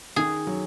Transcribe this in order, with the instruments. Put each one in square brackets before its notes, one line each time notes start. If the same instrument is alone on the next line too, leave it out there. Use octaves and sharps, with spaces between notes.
[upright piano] D#3 [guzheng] G#4
[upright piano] F#3